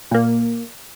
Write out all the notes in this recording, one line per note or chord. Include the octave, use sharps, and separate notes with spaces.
A#2 A#3